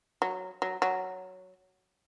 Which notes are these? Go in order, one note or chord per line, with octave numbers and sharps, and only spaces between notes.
F#3
F#3
F#3